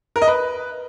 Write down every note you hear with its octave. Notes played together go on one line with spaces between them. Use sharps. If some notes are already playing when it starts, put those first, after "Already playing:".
A#4
D#5
B4